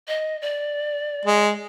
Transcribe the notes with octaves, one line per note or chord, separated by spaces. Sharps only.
D#5
D5
G#3